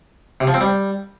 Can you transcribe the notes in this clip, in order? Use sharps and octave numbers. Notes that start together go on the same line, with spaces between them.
C3
F3
C4
G3